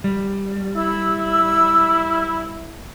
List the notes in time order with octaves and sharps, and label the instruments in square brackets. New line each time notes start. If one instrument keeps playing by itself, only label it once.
[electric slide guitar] G3
[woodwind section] E4 [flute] E6